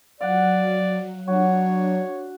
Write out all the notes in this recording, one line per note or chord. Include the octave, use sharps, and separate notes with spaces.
F#3 D5 F5 F#5
F#3 D4 F#4 C#5